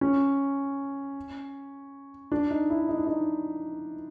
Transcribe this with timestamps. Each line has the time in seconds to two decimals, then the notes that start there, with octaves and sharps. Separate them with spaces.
0.01 C#4
2.32 D4
2.51 D#4
2.70 E4
2.89 D#4
2.98 D4
3.07 D#4